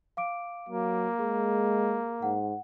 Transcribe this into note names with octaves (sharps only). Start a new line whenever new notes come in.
F5 D6 D7
F#3 A#3
G#3 G#4
G#2 F#5